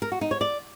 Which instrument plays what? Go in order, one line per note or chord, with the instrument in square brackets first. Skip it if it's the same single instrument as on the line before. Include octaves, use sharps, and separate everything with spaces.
[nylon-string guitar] A#4
F#4
D#4
C#5
D5